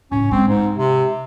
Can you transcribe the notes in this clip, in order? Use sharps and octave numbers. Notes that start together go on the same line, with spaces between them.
A2 C#3 C#4
G#3 C4 D4
G#2
C3